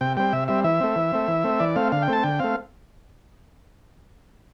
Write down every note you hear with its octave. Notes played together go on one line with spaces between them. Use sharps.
C3 G5
G3 C4 G5
C3 E5
G3 C4 E5
E3 E5
A3 C4
E3
A3 C4
E3
A3 C4
E3 D5
A3 C4 F5
D3 F5
G5
A3 C4 A5
D3 G5
A3 C4 F5